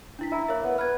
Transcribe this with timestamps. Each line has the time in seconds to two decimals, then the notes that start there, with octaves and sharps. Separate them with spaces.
0.19 D4 E4 B6
0.32 E4 A#5
0.48 A#3 C#5 E5
0.64 B3
0.78 B4 F6 G#6